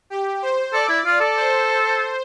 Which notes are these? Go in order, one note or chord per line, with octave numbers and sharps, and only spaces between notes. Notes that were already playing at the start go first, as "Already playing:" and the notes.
G4
C5
A4 D5
E4
F4
A4
C5